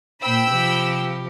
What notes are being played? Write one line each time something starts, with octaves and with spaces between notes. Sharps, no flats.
A#2 C5 G5 B5 E6
C3 F3 G4